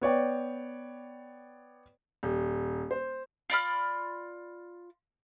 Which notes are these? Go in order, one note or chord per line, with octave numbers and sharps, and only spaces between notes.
B3 C#5 D5 G5
D#1
C5
F4 D5 B5 F6